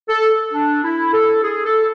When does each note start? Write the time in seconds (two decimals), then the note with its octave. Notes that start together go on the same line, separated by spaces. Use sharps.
0.08 A4
0.53 D4
0.83 E4
1.13 A4
1.42 G#4
1.65 A4